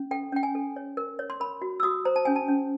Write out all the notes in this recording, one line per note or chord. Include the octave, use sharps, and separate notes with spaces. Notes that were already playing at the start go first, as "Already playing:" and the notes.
Already playing: C#4
A4 G5
C#4 G5
G#5
A4
C#5
A#4
C#5
C6
A#4 B5
F#4
E6
F#4 D#6
C5 A#5
A5
C#4 G#5
A5
C#4